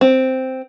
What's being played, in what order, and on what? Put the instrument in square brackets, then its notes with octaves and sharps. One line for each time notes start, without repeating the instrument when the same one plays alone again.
[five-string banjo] C4